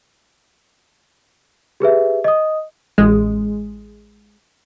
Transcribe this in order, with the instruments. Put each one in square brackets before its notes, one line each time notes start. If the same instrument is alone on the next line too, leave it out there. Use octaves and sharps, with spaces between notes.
[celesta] G4 G#4 B4 E5
D#5 D#6
[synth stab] A1 G#3